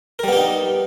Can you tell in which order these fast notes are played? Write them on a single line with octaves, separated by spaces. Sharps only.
A#4 G3 B3 G4 D#4